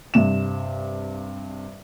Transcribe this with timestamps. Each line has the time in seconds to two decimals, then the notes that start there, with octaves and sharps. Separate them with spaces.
0.14 G2 C3 E7